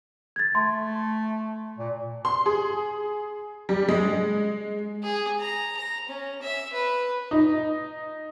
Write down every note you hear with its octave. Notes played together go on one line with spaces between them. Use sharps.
G#6 A6
A3 C6
A#2
C6
G#4
G3
G#3
G#4
A#5
A#5
C#4
E5
B4
D#4